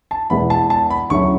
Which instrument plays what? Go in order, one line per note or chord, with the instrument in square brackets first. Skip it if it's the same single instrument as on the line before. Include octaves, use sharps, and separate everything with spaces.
[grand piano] A5
[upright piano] E2 B2 G#3 B3 E4 [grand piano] B5
[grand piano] A5
A5
B5
[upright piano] D2 C#3 F#3 C#4 E4 [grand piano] C#6